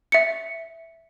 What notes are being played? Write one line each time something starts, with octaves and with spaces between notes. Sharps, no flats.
E5 C#7